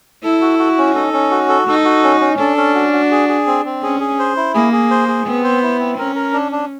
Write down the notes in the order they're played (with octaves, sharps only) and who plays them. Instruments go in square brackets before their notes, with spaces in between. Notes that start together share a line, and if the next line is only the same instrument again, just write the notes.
[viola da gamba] E4 [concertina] A4
[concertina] F#4
F#4
C#4
[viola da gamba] D#4 [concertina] A4
[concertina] C#4
F#4
A4
[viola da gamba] D#4 [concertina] A4
[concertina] F#4
C#4
C#4
[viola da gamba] D4 [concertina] A4
[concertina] C#4
F#4
F#4
G#4
G#4
C4
C4
[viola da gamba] C#4 [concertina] G#4
[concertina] G#4
C5
E4
[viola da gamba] A#3 [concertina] G#4
[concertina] G#4
C5
G#4
[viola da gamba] B3 [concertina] C4
[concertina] C5
E4
C4
[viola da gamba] C#4 [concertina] A#4
[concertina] A#4
D4
D4